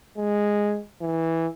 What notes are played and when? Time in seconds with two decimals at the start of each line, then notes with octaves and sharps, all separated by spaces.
0.17 G#3
1.02 E3